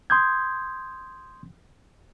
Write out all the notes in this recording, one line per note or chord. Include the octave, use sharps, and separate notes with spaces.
C6 D#6 G6 G#6